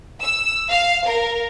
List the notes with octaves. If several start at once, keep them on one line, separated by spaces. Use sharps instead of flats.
E6
F5
A#4